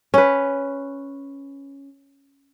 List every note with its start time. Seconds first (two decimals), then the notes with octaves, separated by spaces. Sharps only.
0.14 C#4 B4